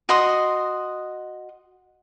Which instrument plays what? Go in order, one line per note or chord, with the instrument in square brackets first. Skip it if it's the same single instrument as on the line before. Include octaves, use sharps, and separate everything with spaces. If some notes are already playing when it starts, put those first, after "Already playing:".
[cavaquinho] F#4 D#5 C6 D#6